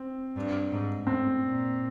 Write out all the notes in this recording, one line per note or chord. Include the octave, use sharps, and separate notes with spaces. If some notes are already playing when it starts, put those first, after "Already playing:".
Already playing: C4
G2
G#2
A2 C4
A#2